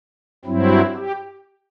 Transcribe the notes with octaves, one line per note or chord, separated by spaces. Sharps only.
G2 F#3 C4 E4
G4